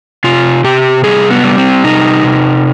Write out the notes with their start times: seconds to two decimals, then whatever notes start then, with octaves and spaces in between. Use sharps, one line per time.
0.24 C3 F4
0.64 C3 G4
1.04 G3 G#4
1.31 B3
1.44 G3
1.58 C4
1.84 C3 D#4
2.24 C3